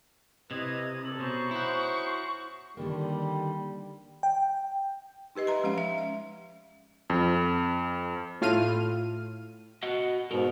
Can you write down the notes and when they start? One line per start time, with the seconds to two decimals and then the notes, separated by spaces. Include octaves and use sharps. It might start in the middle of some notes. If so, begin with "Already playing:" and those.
0.51 C3 E4 B4 D#5 G#6
1.04 G2 A#3 A4 F#7
1.20 B2 C#4 D#4 C5 C#6
1.51 E4 F#4
2.77 D3 D#3 G3 A#3
4.23 G5
5.35 D#4 G4 B4 D#5
5.47 B4 E5 A#5 C6
5.63 F3 G#3 C#4 F5 F#5
5.78 E5
5.98 E5
7.10 F2
8.41 A2 F4 F6 D#7
9.83 F#4 D#5 F#5
10.31 G#2 B2 F#4 A#4